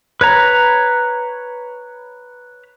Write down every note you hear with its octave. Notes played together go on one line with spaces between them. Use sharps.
B4 C#5 A#5